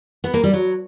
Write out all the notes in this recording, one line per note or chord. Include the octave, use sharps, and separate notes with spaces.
B3
A#3
G3
F#3